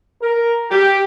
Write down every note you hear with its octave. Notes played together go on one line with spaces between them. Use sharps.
A#4
G4